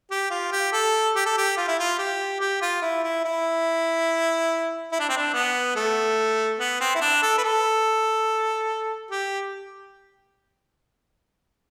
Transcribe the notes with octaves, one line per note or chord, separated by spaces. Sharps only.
G4
F4
G4
A4
G4
A4
G4
F4
E4
F4
G4
G4
F4
E4
E4
E4
E4
D4
C4
D4
B3
A3
B3
C4
E4
D4
A4
B4
A4
G4